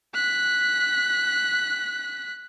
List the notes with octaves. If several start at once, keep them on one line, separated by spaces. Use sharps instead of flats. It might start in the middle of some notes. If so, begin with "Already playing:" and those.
F#6 B6